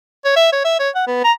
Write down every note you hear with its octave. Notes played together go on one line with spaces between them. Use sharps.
C#5
E5
C#5
E5
C#5
F#5
B3
A#5